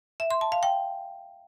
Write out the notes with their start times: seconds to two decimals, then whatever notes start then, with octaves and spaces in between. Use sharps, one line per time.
0.20 E5
0.31 C6
0.41 A5
0.52 F5
0.63 G5